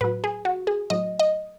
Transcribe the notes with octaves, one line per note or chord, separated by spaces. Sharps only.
A2 F#3 B4
G#4
F#4
G#4
A2 F#3 D#5
D#5